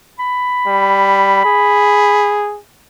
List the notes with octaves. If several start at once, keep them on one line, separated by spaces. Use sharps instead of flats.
B5
G3
G#4